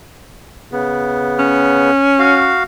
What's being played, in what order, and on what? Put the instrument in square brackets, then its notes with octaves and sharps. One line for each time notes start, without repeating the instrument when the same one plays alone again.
[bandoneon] C#3 B3
[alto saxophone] C#4
[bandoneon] F#4 F5